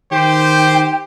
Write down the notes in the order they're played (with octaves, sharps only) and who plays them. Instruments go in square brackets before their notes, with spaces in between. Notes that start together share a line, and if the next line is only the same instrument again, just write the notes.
[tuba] D#3 [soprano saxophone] G4 [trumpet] C5 [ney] G5